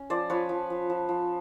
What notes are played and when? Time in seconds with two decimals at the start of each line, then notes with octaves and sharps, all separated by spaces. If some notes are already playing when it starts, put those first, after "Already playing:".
Already playing: C#4
0.10 F3 C5 D5
0.30 F3 B4 C#5
0.49 F3
0.70 F3
0.90 F3
1.09 F3